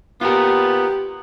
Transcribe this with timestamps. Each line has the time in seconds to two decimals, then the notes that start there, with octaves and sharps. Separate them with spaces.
0.21 B3 F4 G4 A#4